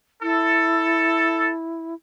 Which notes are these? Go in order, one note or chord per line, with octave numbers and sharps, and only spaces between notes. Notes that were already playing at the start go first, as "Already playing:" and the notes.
E4 A4